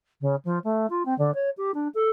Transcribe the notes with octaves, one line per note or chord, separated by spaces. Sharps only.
C#3
F3
A3
F4
C4
D3
C#5
G4
D4
A4